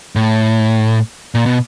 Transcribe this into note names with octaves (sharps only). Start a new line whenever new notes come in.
A2
A#2
B2